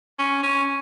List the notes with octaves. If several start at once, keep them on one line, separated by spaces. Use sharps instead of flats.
C#4
C#4